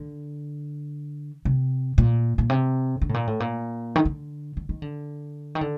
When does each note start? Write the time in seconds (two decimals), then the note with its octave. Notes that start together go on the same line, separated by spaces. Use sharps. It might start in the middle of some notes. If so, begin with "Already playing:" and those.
Already playing: D3
1.45 C3
1.98 A#2
2.38 A#2
2.50 C3
3.01 D3
3.09 A2
3.14 A#2
3.27 A2
3.40 A#2
3.96 D#3
4.05 D3
4.57 D3
4.69 D#3
4.82 D3
5.55 D#3
5.61 D3